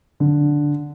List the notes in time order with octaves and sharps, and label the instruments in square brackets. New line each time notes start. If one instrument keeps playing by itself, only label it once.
[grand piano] D3